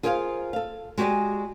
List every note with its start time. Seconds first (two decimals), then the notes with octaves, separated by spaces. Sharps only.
0.03 F4 G#4 A#4 C5 D#5 F5
0.53 A4 F5
0.98 G#3 F#4 G4 D5 G#5